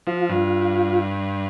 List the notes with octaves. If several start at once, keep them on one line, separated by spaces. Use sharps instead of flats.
F3 F4
G2